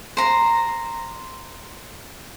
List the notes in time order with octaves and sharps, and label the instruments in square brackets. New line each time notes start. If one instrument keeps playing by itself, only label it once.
[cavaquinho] C5 A#5